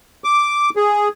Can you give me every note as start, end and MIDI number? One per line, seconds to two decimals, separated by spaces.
0.24 0.70 86
0.76 1.08 68